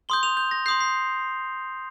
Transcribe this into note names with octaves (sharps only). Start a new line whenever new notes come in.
C6 D#6 G6 G7
F7
G6
A#6
C6 D#6 G6 C7
C7